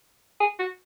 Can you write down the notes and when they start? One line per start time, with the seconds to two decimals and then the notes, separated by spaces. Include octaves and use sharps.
0.40 G#4
0.59 F#4